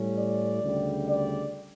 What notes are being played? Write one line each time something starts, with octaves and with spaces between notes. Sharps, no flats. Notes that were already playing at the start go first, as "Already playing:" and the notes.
Already playing: A2 G3 C#4
D5
D2 C#3 G3
D5